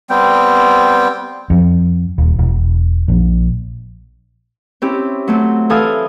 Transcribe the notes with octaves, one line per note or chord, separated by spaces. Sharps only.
G3 B3 C4 G5
F2
D#1
E1
A#1
C4 C#4 E4 G4
F#3 A3 C4
E3 A4 F5 G#5 D#6